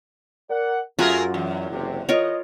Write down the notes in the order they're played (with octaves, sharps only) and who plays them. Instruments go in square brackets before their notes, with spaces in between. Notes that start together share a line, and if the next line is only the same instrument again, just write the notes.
[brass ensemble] A#4 D5 F#5
[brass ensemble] F#2 [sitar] A3 G#4 A#4 [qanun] F4 F#4
[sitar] E2
[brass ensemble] F#1 C3
[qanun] F4 A#4 C#5 [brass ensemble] D#5